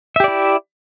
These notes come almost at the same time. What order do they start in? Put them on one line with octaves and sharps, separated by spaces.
E5 G4 D5 E4